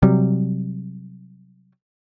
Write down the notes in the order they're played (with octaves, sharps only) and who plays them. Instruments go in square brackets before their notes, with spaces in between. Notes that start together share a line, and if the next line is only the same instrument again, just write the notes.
[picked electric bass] C3 F#3 G3